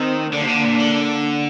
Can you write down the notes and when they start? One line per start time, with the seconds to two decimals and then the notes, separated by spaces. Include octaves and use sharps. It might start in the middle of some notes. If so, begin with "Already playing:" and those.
Already playing: D#3 C4 D#4
0.33 D3 A#3 D4
0.43 C3
0.48 D3
0.64 A#2
0.80 D3